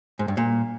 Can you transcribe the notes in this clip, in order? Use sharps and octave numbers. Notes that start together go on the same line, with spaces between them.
G#2
G2
A#2